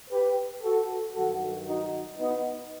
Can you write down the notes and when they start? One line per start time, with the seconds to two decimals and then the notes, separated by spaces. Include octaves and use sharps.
0.11 G4 B4
0.62 F#4 A4
1.14 G2 D#3 F#3 F#4 A4
1.66 D#4 F#4
2.17 B3 D#4